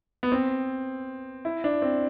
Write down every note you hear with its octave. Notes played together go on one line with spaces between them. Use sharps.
B3
C4
E4
D4
C4